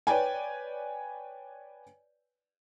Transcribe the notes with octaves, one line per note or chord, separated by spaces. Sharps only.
B4 C#5 D5 G5 G#5